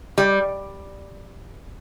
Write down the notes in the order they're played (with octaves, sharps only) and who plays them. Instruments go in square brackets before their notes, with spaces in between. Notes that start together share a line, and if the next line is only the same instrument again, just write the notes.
[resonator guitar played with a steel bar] G3